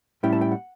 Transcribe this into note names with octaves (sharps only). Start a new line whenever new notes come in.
A2 G3 C#4 E4 G5
A5
G5
F#5